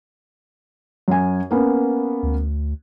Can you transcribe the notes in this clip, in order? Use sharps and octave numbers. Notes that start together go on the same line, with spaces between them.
F#2 G#5
A#3 B3 C#4
D2